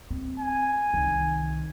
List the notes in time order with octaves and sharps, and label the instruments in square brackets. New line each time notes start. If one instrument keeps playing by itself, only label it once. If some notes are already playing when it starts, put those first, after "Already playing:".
[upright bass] C4
[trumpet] G#5
[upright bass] C2 D#3